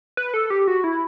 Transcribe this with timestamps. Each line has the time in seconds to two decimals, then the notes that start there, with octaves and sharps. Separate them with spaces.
0.17 B4
0.34 A4
0.50 G4
0.68 F#4
0.84 E4